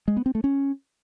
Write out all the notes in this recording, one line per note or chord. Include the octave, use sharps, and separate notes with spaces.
G#3
B3
C4
A3
C#4